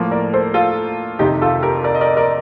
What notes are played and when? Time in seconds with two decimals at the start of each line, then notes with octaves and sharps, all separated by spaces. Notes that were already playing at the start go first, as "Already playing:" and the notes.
Already playing: A2 F3 A#3
0.11 A#4 D5
0.33 A4 C5
0.54 F4 A4
1.19 F2 C3 D#3 D#4 G4
1.41 F4 A4
1.63 G4 A#4
1.84 A#4 D5
1.95 D#5
2.01 A#4 D5
2.17 A#4 D5